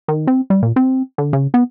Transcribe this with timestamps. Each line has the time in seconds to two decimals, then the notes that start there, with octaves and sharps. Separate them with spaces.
0.08 D#3
0.27 C4
0.50 G3
0.63 A#2
0.76 C4
1.18 D3
1.33 C#3
1.54 B3